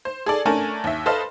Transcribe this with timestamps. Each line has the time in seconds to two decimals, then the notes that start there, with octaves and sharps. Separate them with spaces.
0.05 C5
0.26 G#4 A4 D5
0.46 A3 C#4 D4 A#4 G#5 A5
0.84 D#2 E5
1.06 A4 B4 C5 D#5 F5